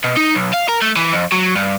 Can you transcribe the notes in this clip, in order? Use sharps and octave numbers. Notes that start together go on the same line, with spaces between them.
B2
D#4
B1
F5
A#4
A3
E3
F2
F#3
G2